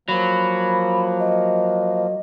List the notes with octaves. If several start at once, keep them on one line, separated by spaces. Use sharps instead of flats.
F3 F#3 A#3 B5
D#5